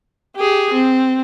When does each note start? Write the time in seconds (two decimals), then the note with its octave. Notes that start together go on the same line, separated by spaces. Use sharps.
0.36 G4 G#4
0.73 C4